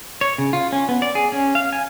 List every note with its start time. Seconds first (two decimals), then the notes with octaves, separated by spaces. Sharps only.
0.21 C#5
0.38 C#3
0.53 F4
0.72 C#4
0.89 B3
1.02 D5
1.15 G#4
1.32 C#4
1.55 F5
1.73 G#5